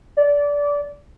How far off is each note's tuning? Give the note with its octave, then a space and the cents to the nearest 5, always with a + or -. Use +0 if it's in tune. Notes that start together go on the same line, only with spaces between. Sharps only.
D5 -20